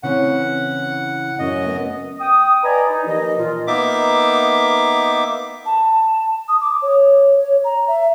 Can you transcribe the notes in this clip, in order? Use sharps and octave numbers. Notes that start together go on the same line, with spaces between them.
C#3 E3 C4 F#5
F#2 C#3 D#5
B3
G5 D#6
B4 D5 D#5 G#5 A#5
D#4
D#2 E3 F3 D#5
A#2 F4
A#3 B3 D#4 E5 D6
A5
D#6
D6
C#5
C#5
A#5
E5